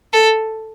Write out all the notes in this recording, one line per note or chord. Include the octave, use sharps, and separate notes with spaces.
A4